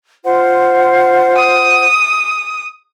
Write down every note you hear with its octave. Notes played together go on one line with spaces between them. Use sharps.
F4 C5 F#5
D#6